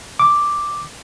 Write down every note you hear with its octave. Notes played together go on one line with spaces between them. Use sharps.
D6